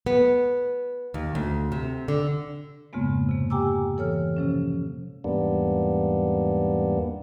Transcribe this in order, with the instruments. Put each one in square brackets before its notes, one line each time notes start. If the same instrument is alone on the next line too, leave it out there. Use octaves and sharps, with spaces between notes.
[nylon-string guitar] B3
D#2
D2
C3
D3
[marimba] F2 G#2 C#3 G#3 A#3 B3
C3 A#3
G4 G5 G#5 A#5 D6 E6
E3 A4 C#5 F6
C3 F3 C#4
[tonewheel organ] E2 G#2 G3 A#3 B3 D4